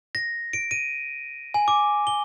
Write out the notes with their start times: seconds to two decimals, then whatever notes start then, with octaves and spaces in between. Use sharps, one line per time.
0.15 A#6
0.53 D7
0.71 D#7
1.54 G#5
1.68 D6
2.07 G7